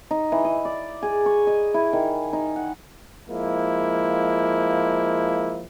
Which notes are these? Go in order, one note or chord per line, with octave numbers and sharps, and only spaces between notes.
D#4
E3
D#5
D5
G#4
C#6
D#5
E4
D#3
D#4
F#5
F3 G#3 A#3 E4